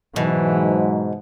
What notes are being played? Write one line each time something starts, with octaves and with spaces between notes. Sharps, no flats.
G#2 B2 E3 F#3